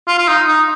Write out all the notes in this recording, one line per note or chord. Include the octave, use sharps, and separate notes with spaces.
F4
F4
D#4
D#4